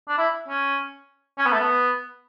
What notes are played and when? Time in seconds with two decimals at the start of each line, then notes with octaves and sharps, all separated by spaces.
0.09 D4
0.18 E4
0.48 C#4
1.39 C#4
1.46 B3
1.53 A3
1.60 B3